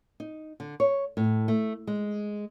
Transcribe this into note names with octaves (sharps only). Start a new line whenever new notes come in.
D#4
D3
C#5
A2
A3
G#3